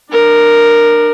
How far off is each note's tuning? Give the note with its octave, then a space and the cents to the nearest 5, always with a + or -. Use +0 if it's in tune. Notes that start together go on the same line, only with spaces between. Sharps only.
D4 +30 A#4 +0